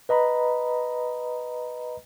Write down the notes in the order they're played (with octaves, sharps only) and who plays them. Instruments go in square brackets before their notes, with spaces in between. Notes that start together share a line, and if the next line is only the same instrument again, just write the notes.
[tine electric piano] B4 D#5 A#5 B5